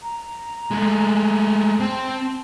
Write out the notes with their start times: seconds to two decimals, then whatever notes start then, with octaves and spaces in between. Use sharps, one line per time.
0.01 A#5
0.71 G#3 A3
1.80 C4 A5